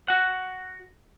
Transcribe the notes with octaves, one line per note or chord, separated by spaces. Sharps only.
F#4 F#5